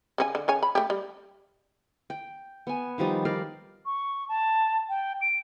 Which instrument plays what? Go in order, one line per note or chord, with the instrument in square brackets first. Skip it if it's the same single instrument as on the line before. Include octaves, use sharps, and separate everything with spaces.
[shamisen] C#3 C4 G#5
D3
C#3 C#5 G#5
B5
A3 G4
G3
[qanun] G5
B3 G#5
D#3 F3 G3 D#4
A#4 D5 F5 G5
[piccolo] C#6
A5
G5
D7